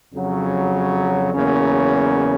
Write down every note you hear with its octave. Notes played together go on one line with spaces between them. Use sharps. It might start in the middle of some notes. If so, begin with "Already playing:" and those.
F2 C#3 F#3
E2 C#3 F#3 A#3 C#4